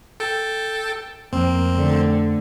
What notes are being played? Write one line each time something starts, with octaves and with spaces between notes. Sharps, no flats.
A4 G5 A5
F2 A#3 C4
D3 A3